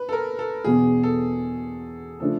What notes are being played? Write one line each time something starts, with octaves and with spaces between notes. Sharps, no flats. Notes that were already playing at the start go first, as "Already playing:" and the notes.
Already playing: B4
A4
A#4
A4
E1 E2 B2 G#4
A4
C#3 F3 A3 D4 A4